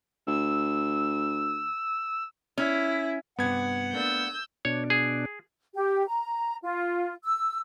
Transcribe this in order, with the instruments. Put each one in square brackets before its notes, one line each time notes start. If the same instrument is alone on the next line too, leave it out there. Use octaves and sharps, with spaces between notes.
[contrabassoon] D2 [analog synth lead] E6
[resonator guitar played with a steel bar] C#4 [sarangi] E4
[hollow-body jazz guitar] G2 C3 [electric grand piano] B3 G#6 [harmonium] F#5
[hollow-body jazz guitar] A3 A#3 D4 [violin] E6 G6
[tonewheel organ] B2 D4 [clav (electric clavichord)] C#5
[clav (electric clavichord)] G#4
[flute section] G4
A#5
F4
E6